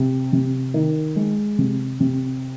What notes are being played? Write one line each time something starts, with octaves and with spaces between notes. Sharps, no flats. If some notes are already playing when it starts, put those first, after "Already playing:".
Already playing: C3
C3
D#3
G#3
C3
C3